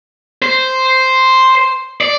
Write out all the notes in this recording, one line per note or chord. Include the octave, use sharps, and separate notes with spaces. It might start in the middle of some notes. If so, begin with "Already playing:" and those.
C5
D5